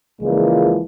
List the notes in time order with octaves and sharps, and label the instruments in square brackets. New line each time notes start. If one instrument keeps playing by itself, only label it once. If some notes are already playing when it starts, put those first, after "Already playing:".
[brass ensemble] C#2 A#2 E3 F3 G#3